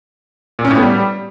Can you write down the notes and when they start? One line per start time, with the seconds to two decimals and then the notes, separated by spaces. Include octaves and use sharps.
0.59 A#2
0.65 C#4
0.71 A2
0.77 B3
0.82 G3